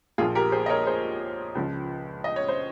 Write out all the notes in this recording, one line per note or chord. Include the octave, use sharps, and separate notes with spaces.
A#1 A#2 F3 F4 G#4
G4 A#4
G#4 C5
D#5
A#4 C#5
G#4 C5
C#2 C#3 F3
D#5
C#5
C5